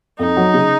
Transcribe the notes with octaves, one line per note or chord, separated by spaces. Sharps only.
F2 D#4
F#3
C#3